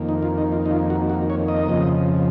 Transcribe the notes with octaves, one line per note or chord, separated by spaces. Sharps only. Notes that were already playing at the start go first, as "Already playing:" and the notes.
Already playing: F2 D#3 A#3
D#4
F4
D#4
F4
D#4
F4
F#4
F#4
C#5
D#5
F2 C#3 F3